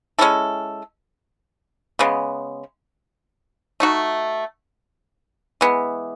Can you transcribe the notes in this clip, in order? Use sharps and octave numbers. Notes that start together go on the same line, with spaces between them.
G#3 C#4 E4 A4
C#3 G#3 B3
A3 D#4 F#4
E3 G#3 B3